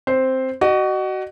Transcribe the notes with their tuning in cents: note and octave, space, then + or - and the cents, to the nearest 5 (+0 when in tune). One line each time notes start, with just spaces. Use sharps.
C4 +0 C5 +0
F#4 +25 D#5 -30